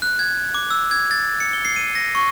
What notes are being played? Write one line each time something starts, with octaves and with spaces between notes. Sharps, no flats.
F#6
G#6
D6
E6
G#6
A6
C#7
G7
C7
D#7
A#6
C#6